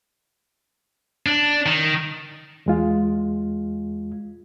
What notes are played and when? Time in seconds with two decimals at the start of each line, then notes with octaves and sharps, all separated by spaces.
1.26 D4
1.66 D#3
2.66 E2 G#3 F4